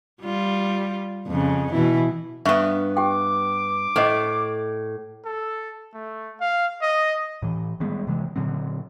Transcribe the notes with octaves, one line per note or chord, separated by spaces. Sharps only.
G3 F4
F2 C#3
B2 E3 E4
G2 B3 E5 C#6
G4 G5 D6
A2 A4 C5 D#5
A4
A3
F5
D#5
A2 E3
D#3 G3 G#3 B3
C3 E3 F3 G#3
A#2 D3 F#3 C4